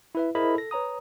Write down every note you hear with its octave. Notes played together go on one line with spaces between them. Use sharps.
E4 B4 E5
E4 G#4 A#4 C5 D#5 B5
A4 A#6
B4 C#5 A#5 D#6